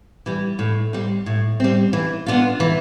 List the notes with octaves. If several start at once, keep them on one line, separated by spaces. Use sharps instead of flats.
E3 G3
A2
G3 C4
A2
G3 C4
E3
B3 D4 F4
E3